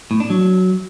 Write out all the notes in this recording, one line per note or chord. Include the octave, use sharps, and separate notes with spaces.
A2
D4
F#3